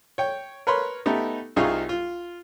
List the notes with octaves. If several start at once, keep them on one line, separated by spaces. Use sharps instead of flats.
C#5 G5
A#4 B4 C#5 B5 C6
A3 B3 D#4 G4
C2 D#4 F4 G#4 F5 C#6
F4